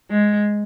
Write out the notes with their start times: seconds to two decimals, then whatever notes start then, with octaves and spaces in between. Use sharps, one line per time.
0.10 G#3